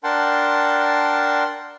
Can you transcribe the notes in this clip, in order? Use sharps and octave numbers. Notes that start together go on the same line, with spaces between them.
D4 A#4 F#5 G5 A5 C6